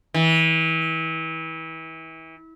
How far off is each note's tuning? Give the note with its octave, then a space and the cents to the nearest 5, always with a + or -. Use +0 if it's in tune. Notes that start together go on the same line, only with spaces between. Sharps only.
E3 -30